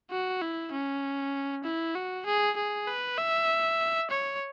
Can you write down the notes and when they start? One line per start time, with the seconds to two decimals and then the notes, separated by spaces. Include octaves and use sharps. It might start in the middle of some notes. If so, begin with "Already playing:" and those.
0.11 F#4
0.42 E4
0.72 C#4
1.65 E4
1.95 F#4
2.26 G#4
2.57 G#4
2.87 B4
3.18 E5
4.11 C#5